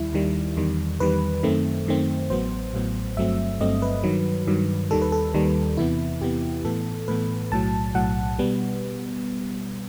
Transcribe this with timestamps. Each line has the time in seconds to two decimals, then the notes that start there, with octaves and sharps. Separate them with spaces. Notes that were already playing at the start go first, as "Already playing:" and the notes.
Already playing: D#2 D#3 G3 E4
0.13 D#2 D#3 G3
0.57 E2 D#3 G3
1.00 E2 D#3 G3 B4
1.43 F#2 D#3 A3 C4
1.86 F#2 D#3 A3 C4
2.30 A1 A2 F#3 B3 C5
2.73 A1 A2 F#3 B3
3.17 G1 G2 F#3 A3 C4 E5
3.60 G1 G2 F#3 A3 C4 D#5
3.82 B4
4.04 G2 D#3 F#3
4.47 G2 D#3 F#3
4.91 D#2 D#3 G3 A4
5.02 B4
5.12 A4
5.34 D#2 D#3 G3
5.77 E2 C3 E3 B3 E4
6.21 E2 C3 E3 B3 G4
6.65 A2 E3 B3 A4
7.08 A2 E3 B3 B4
7.51 B1 A2 F#3 A5
7.95 B1 A2 F#3 F#5
8.39 B2 G3 B3